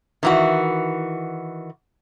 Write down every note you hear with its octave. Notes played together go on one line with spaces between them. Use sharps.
D#3 E3 F#4